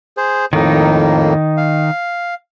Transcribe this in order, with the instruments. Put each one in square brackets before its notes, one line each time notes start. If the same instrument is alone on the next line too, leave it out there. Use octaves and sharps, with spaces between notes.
[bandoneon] G#4 C5
[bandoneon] F2 A2 A#3 [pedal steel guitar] D#3 D#4
[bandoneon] F5